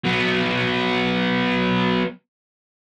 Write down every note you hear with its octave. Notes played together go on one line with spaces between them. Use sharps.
F#3 B3